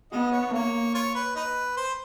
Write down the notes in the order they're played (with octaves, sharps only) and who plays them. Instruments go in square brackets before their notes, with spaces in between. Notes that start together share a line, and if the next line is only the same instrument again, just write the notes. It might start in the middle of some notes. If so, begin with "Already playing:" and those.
[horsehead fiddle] B3 [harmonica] D#5
[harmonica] C#5
[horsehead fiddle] A#3 [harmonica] C#5
[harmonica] F4 C#5
B4
D#4 B4
C5